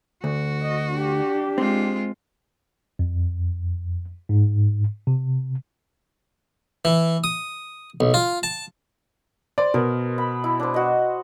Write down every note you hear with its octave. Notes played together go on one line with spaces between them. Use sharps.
D2 F#4
D#5
D4 G4
G#3 C4 F4
F2
G#2
C3
E3
D#6
B1
F4
A5
C5 D5
B2 A#4
B5
E4
D4 C5
F#4 D#5